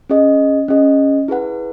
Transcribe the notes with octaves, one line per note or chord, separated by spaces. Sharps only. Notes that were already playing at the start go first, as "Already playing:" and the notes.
C#4 G#4 D#5
C#4 G#4 D#5
E4 G#4 B4 F#5